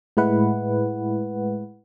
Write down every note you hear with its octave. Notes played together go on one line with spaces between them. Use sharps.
A2 G#3 E4 B4 F#5